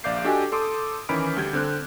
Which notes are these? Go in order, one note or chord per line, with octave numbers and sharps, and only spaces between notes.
A#1 D5 F5 D6 G6 C7
D4 F#4 G4 A4 D#5 G#5
A4 C6 D6 D#6
D#3 E3 C#4 B5 F6 D7
D2 G3 G6 G#6
D3 C4 F#6